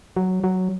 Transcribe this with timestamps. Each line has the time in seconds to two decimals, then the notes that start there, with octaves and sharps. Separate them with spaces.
0.16 F#3
0.44 F#3